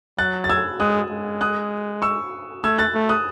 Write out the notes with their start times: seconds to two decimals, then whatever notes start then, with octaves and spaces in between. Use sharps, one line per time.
0.18 F#3 F#6 A6
0.44 A6
0.49 E6 G#6
0.80 G#3 D#6 F#6
1.11 G#3
1.41 D#6 F#6
2.02 C#6 E6
2.64 A3 E6 G#6
2.78 F#6 A6
2.94 A3
3.09 D#6 F#6